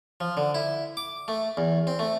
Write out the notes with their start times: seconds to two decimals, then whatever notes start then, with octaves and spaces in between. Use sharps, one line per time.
0.20 F3
0.37 D3
0.55 E4
0.97 D6
1.28 A3
1.57 E2
1.87 C4
1.99 A3